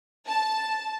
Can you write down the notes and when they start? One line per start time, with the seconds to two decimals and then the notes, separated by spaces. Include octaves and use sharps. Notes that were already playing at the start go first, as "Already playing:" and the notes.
0.27 A5